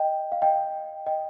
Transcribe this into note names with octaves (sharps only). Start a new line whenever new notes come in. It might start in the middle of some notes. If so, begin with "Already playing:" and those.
Already playing: D#5 G5
F5
D#5 G5
D#5 G5